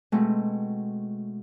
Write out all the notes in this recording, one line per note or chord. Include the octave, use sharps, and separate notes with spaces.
B2 G#3 A3 C4